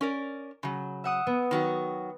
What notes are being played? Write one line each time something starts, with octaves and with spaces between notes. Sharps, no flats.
C#4 A#4 D5
C#3 F#3
E5 F#5 D#6
B3
D#3 F#3 F#4